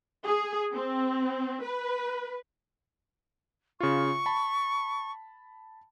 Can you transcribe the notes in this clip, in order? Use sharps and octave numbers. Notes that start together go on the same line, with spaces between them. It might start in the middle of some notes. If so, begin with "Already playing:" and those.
G#4
C4
B4
C#3 F4 C#6
A5 B5